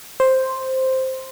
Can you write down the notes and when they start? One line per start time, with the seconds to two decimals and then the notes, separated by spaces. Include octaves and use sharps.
0.20 C5